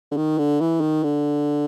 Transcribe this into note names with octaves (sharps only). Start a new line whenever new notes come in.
D3
D#3
D3
E3
D#3
D3